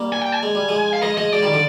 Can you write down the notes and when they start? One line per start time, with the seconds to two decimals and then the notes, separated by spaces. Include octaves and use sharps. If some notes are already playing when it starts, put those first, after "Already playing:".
Already playing: G3 A#3
0.12 G#5
0.22 G5
0.32 G#5
0.43 G#3
0.55 G3
0.69 F3 G#3
0.93 F5
1.02 F3 G#3 D#5
1.17 F3 G#3 D#5
1.32 F3 G#3 D5
1.43 D#3 G3
1.53 D3 F3